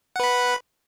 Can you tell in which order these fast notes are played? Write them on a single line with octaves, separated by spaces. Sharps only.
F#5 B4 B5